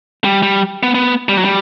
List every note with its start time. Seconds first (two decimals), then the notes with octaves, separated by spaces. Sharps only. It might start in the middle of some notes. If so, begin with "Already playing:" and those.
0.24 G3
0.43 G3
0.83 B3
0.95 B3
1.29 G3
1.37 F#3
1.45 G3